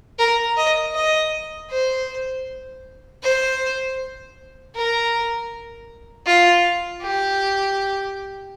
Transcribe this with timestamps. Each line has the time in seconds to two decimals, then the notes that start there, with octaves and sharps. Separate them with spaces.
0.19 A#4
0.57 D#5
0.95 D#5
1.70 C5
3.23 C5
4.75 A#4
6.26 F4
7.02 G4